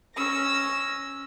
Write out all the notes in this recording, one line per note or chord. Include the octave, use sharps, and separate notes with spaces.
C#4 E6 A#6